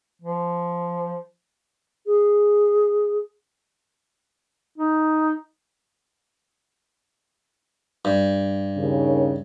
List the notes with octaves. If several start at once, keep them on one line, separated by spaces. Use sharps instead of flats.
F3
G#4
D#4
G2
D#2 C#3